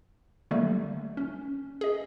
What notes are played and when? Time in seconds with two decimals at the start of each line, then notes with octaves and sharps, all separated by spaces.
0.51 D3 D#3 F#3 G3 A3 A#3
1.17 C#4
1.81 G#4 D#5